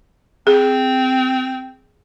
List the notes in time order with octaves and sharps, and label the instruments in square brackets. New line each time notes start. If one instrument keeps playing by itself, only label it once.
[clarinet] C4 [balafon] G#4